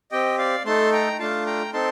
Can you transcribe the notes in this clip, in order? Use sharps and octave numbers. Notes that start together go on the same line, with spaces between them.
C4 G4 D#5 G5
D5 F5
A3 D#4 A4 A5 C6
G5 A#5
A3 D4 F4 F5 A5
G5 A#5
C4 D#4 A4 A5 C6